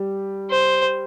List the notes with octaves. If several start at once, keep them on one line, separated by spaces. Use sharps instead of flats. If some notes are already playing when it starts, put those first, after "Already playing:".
Already playing: G3
C5